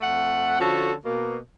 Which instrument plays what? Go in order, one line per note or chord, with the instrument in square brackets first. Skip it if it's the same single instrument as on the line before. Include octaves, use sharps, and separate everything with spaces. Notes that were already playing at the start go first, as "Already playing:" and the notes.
[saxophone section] F2 A3 F#5
D3 F3 C#4 F#4 A4
B2 A#3